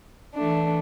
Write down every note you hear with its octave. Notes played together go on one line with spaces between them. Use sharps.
E3 A3 D4